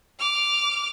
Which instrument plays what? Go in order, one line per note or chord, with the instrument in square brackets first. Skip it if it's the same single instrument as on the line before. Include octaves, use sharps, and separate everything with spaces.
[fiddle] D6 F6